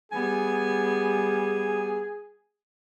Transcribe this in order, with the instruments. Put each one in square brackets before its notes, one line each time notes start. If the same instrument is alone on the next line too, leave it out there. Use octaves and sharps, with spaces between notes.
[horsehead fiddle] G3 B3 [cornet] G#4 [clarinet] G#5